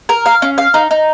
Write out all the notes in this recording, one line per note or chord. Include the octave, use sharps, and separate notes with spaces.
A#4
F5
C#4
F5
D#4
D#4